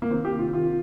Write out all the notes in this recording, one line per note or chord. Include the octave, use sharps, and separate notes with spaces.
A#3
D#3 C4
G4
C3
F4
D#3 F4